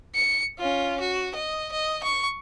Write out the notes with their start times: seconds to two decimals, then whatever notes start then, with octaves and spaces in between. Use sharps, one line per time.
0.15 C#7
0.58 C#4 F4
1.00 F#4
1.35 D#5
1.72 D#5
2.03 C#6